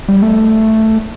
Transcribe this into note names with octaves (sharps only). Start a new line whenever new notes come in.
G3
A3